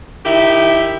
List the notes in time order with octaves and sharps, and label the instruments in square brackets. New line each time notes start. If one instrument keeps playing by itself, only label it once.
[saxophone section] D#3 E4 G4